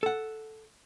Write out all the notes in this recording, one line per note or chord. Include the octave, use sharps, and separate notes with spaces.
A4 F#5